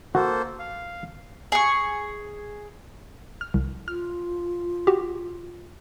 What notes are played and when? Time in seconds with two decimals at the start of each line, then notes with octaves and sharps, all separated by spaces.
0.15 A#3 F#4 A4 C5
0.59 F5
1.52 G#4 C#6
3.41 F6
3.54 C2
3.88 F4 F6
4.87 F#4 G4